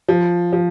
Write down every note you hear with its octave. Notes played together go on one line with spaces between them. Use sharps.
F3
F3